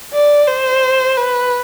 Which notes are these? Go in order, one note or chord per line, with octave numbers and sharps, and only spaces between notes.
D5
C5
B4